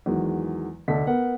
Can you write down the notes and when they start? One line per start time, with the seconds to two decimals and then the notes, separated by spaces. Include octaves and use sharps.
0.06 E2 D#3 F#3 G#3
0.88 F1 D2 D4 A4 D#5 B6
1.07 B3 A#4 F#5